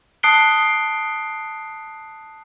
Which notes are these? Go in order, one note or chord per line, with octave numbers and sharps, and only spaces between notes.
A5 D#6 F#6 C7 D7 G7